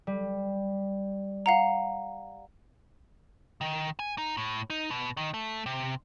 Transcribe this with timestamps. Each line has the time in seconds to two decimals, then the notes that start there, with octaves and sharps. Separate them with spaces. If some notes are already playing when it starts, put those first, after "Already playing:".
0.07 G3
1.46 F5 F#5 A#5
3.61 D#3
3.99 G#5
4.18 D#4
4.37 A2
4.70 D#4
4.91 B2
5.17 D#3
5.34 A3
5.66 C3